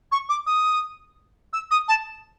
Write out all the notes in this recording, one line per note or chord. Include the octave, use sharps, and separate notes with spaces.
C#6
D6
D#6
E6
D#6
A5